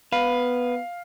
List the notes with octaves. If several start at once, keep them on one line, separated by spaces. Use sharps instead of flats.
B3 B4 F5